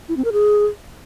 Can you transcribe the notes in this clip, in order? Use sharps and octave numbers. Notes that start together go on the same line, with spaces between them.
E4
C4
A#4
G#4